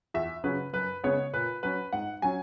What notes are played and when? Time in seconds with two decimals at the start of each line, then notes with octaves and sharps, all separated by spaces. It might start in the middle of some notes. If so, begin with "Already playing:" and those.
0.14 E2 E5
0.44 C#3 F#3 C#4 B4
0.73 F#2 B4
1.04 C#3 G#3 B3 C#5
1.33 A#2 B4
1.63 F#3 C#4 B4
1.93 G#2 F#5
2.22 F#3 C#4 G#5